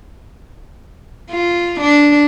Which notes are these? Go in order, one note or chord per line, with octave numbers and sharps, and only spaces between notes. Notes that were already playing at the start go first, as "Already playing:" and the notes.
F4
D4